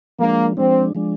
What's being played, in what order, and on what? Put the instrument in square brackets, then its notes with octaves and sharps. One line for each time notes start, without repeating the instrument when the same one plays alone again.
[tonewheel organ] F3 G#3 D4 [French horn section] A#3
[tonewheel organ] F3 G#3 D4 [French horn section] C4
[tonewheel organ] F3 G#3 D4